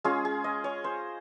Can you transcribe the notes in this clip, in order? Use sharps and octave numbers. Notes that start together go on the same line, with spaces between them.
G#3 C#4 F4 G#4
G#4
D#5
C#5
C5